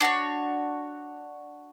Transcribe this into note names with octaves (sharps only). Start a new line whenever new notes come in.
D4 F#4 C#5